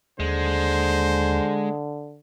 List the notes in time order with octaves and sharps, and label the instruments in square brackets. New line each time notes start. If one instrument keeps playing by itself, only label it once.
[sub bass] D#2 [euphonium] D3 [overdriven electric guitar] G#3 [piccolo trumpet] C5